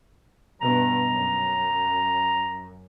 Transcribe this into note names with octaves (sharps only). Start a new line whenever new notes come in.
G2 B2 A#5
F#2